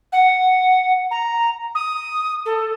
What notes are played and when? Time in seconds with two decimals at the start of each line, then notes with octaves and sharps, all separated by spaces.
0.12 F#5
1.11 A#5
1.75 D#6
2.45 A4